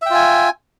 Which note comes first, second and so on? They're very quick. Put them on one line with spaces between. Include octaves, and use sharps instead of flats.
E5 G5 F4 G#5